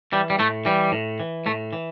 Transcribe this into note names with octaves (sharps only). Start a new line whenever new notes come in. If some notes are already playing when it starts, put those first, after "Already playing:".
E3 G3
G3
A2 A3
E3 G3
A2
E3
A2 A3
E3